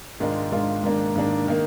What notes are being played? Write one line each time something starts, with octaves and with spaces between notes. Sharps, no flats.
G#2 D#3 G#3 D4 F4
G#2 D#3 G#3 D4 F4
G#2 D#3 A#3 D4
G#2 D#3 A#3 D4
D#3 A#3